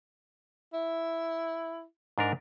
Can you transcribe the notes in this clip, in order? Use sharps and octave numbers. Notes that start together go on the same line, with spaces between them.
E4
G#2 D4 A#4